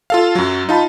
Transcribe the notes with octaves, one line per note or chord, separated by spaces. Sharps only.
F4 A4 F5
F#2 F#3
D#4 F4 A5 B5